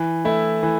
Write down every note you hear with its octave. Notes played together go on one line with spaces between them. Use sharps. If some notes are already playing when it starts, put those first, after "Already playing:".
Already playing: E3
A3 E4
E3